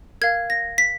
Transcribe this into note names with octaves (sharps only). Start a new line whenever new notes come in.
A#4 F5 G#6
A#6
B6